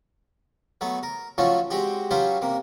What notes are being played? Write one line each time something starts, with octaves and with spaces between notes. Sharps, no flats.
F#3 A3 B3
A#4
F3 F#3 A3 C#4 F4 F#4
G#3 C4 F#4 G4
F#3 C#4 F4 G4 B4 C5
C3 A#3